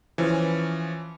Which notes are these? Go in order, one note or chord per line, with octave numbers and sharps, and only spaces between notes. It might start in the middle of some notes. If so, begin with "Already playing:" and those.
E3 F3 C#4